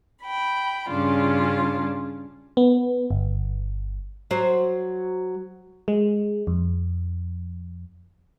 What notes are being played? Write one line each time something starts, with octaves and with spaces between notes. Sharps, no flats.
G5 B5
G2 C#3 C#4 D4 F4
B3
G1
F#3 C5
G#3
F2